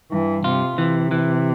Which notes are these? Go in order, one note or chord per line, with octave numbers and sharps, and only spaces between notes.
G2 E3
C3 F4
C3 E3
E3